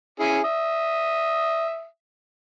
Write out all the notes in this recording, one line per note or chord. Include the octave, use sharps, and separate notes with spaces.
C#4 E4 G#4
E5 D#6